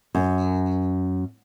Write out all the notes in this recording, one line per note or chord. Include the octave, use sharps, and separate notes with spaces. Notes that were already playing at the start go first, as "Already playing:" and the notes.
F#2